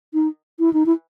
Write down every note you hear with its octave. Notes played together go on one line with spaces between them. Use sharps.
D#4
E4
D#4
E4